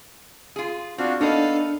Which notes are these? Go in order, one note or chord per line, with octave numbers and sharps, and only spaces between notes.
F4 G#4
C4 D4 F4 F#4
A#3 B3 D4 D#4 A4 F5